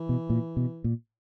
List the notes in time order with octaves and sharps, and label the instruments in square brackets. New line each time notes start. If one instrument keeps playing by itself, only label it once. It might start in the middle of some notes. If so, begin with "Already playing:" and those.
Already playing: [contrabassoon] E3
[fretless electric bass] B2
A#2
B2
A#2